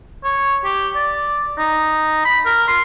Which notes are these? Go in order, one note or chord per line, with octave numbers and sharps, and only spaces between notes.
C#5
G4
D5
D#4
B5
A#4
C6